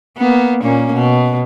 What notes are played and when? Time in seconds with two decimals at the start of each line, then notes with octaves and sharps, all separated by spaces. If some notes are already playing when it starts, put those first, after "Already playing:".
0.18 A#3 B3
0.62 A#2 A#3 C#4
0.93 B2